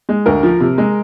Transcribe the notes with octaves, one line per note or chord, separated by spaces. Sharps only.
G#3
D2 A#4
F3
C3
G#3